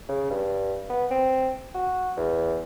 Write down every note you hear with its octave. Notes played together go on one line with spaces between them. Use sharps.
C#3
G2
B3
C4
F#4
E2